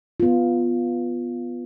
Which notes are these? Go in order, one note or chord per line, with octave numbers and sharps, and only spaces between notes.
B3 F4